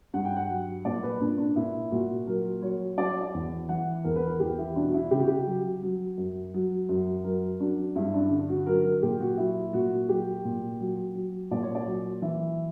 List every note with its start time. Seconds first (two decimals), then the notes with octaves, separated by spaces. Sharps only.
0.14 G2 F#5
0.25 G5
0.36 F#5
0.49 F#3
0.85 A#2 D5
1.03 B4
1.21 A#2 D4
1.38 D4
1.56 A#2 E4
1.91 A#2 F#4
2.27 F#3 A#4
2.62 F#3 C#5
2.97 F#3 D5
3.10 C#5
3.21 D5
3.34 E2
3.69 E3 F#5
4.04 E2 A#4
4.16 B4
4.27 A#4
4.40 E2 G4
4.58 E4
4.76 B2 D4
4.88 F#4
4.94 E4
5.11 C#3 G4
5.19 F#4
5.27 G4
5.46 F#3
5.83 F#3
6.17 F#2
6.54 F#3
6.89 F#2
7.24 F#3 A#4
7.60 F#3 D4
7.96 G2 E4
8.14 D4
8.31 D3
8.49 F#4
8.67 F#3 A#4
8.85 A#4
9.02 A#2 G4
9.20 F#4
9.38 F#3 E4
9.73 A#2 F#4
10.09 F#3 G4
10.45 A#2
10.80 F#3
11.15 F#3
11.51 A#2 D5
11.63 C#5
11.75 D5
11.86 F#3
12.22 E3 E5